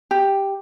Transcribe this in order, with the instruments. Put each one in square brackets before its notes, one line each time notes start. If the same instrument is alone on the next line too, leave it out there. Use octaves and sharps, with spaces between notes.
[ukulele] G4